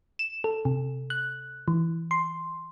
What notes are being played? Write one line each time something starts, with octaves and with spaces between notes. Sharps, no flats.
E7
A4
C3
F#6
E3
C6